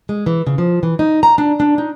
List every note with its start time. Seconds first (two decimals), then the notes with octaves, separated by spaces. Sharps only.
0.09 G#3
0.26 E3
0.47 C#3
0.58 F3
0.83 E3
0.99 D#4
1.23 A#5
1.38 D4
1.60 D4
1.78 D#4